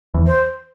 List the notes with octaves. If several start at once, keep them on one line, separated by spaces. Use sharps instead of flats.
E2
C5